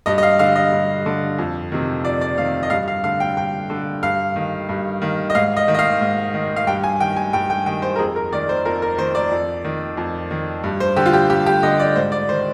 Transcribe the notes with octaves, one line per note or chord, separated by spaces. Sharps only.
G2 D#5
D#5
F5
D3 F5
D#5
G2
D3
F2
C3 D#3
F2 D5
D5
C3 D#3 F5
D#5
G2 F5
F5
D3 F5
G5
G2 G5
D3
G2 F5
D#3
G2
D#3
D#5
G#2 F5
D#5
D#3
D#5
F5
G#2
D#3
F5
G2 G5
G#5
D#3 G5
G#5
G2 G5
G5
D#3 G5
C5
A#4
F2 G#4
A#4
D#3 D5
C5
F2 A#4
A#4
D#3 C5
D5
F2
D#3
F2
D#3
G2
C5
D3 G4
F4
G4
G2 G4
G4
D3 D#5
D5
G#2 C5
D5
D#3 C5